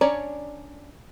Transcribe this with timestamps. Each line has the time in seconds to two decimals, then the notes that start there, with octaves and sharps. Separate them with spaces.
0.01 C#4 D4 C#5 D5 A#5